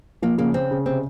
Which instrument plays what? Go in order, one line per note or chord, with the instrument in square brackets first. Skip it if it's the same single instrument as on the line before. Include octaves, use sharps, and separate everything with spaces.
[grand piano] F3 [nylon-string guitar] A#3
[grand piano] C#3 [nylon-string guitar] A#3
[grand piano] C#3 [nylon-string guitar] C4
[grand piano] C#3
[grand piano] C3 [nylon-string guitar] C4